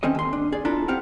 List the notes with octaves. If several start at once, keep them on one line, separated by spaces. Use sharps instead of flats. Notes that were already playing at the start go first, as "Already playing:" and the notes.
D#3 C4 C#4 A4 D#5
D#2 C6
D4
G#4 D5
B2 D4 E4 F4 A4 A#5
C4 G4 F5 F#5